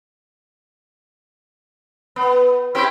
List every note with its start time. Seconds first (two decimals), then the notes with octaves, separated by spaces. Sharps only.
2.16 B3
2.75 C4 E4 G4